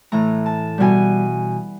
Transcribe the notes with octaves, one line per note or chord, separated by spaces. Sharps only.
A2 E3 A3 A#5
A5
B2 G3 B3 G#5